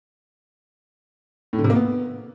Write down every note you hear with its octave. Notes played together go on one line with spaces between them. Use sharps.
A2
D3
C3
A#3
B3